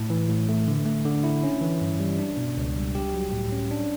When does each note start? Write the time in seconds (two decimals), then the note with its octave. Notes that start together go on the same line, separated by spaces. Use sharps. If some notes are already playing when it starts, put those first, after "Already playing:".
Already playing: A2
0.10 E3
0.29 A2
0.49 A3
0.68 D3
0.85 A3
1.05 D3
1.24 E4
1.43 C#4
1.61 E3
1.81 G2
2.00 G3
2.19 D4
2.37 B2
2.57 C#2
2.76 G3
2.95 G4
3.14 F#3
3.32 A2
3.52 C#4
3.71 D4